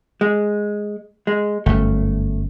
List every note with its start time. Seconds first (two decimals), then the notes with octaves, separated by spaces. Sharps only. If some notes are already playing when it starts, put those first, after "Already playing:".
0.21 G#3
1.27 G#3
1.66 G1 F#2 A3